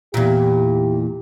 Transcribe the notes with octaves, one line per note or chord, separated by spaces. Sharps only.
E2 A#2 G4